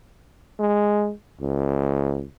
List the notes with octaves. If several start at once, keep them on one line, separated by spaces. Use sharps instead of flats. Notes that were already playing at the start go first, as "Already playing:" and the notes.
G#3
C#2